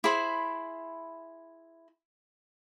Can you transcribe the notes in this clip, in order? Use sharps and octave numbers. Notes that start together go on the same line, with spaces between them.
E4 G#4 C5 B5